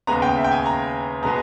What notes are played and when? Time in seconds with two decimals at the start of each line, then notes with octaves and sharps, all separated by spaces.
0.07 D#2 C#3 G#3 B3 A#5
0.22 G5
0.37 E5
0.44 G5
0.52 G#5
0.66 A#5
1.23 B2 G#3 B3 A#5